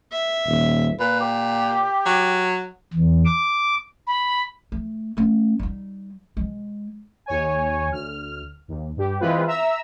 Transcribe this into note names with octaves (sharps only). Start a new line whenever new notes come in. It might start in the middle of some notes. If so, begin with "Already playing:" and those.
E5
D#1
A#2 B4
G4
F#3
E2
D6
B5
A3
A3 C#4
G3 D#4
G#3
D#2 C#5 G#5
D2 F6
D#2
G2 G4
E3 G#3 C4 F4 B4
E5 A#5 E6